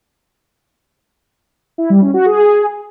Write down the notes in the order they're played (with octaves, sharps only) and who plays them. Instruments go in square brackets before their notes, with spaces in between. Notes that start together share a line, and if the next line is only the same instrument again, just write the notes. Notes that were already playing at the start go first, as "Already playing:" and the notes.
[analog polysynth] E4
G3
C#4
F#4
G#4